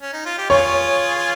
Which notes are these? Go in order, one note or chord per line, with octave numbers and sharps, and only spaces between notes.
C#4
D#4
F4
G4
F4 G#4 C#5